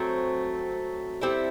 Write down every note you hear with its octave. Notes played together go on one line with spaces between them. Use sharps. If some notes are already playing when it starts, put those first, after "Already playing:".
Already playing: F#3 A3 C4
G3 C4 E4 A4